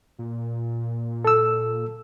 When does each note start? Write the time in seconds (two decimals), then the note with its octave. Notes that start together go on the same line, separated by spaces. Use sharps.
0.19 A#2
1.25 A4 E6